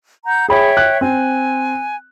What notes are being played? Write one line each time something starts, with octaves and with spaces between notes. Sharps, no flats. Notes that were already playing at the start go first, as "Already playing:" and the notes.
F#5 A#5 G6
G#4 C#5 E5 G5 B5
F#6
C4 G#5